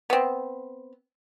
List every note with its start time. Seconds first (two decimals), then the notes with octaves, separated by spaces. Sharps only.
0.10 B3 C4